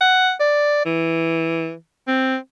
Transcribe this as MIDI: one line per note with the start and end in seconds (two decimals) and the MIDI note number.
0.01 0.32 78
0.40 0.81 74
0.85 1.74 52
2.08 2.37 60